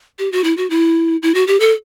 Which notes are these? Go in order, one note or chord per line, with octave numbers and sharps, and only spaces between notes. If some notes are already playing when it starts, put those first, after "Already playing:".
G4
F#4
E4
F#4
E4
E4
F#4
G4
A4